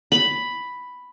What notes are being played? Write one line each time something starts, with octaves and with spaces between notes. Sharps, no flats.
B5